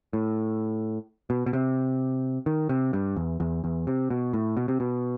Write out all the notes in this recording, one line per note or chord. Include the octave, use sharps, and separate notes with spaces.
A2
B2
B2
C3
D#3
C3
G2
E2
E2
E2
C3
B2
A2
B2
C3
B2